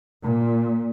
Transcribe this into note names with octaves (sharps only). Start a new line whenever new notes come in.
A#2